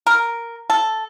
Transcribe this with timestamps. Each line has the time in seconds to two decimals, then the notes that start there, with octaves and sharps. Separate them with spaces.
0.07 A#4
0.70 A4